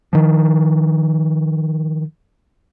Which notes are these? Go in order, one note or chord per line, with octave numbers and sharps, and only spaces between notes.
D#3 F3